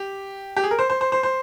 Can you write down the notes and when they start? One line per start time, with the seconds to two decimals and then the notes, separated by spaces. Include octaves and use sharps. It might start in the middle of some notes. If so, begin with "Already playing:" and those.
Already playing: G4
0.57 G4
0.64 G#4
0.71 A#4
0.79 C5
0.90 C5
1.01 C5
1.12 C5
1.23 C5